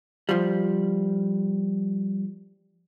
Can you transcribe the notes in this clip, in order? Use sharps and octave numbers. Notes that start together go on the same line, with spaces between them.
F3 G3